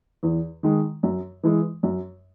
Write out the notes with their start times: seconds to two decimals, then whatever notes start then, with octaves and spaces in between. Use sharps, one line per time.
0.23 E2
0.63 D#3 G#3
1.03 F#2
1.43 E3 G#3
1.83 F#2